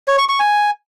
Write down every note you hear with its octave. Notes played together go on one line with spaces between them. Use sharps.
C#5
C#6
C#6
G#5